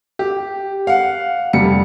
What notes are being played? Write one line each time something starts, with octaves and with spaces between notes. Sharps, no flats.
G4
F5 F#5
F1 G3 C#7